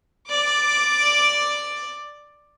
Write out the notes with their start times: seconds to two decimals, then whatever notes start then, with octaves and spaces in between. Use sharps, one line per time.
0.29 D5 D6